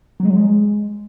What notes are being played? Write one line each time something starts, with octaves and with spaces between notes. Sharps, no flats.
F#3
G#3
F#3
G#3